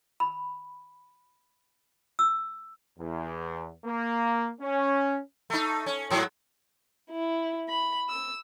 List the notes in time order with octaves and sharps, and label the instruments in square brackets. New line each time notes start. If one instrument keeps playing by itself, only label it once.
[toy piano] B5
E6
[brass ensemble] E2
A#3
C#4
[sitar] A3 D#4
C#4
G#2 F#3
[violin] E4
B5
E6